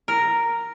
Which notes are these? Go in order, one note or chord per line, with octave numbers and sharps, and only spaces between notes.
A#4